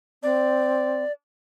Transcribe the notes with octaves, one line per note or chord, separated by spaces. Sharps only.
C4 D5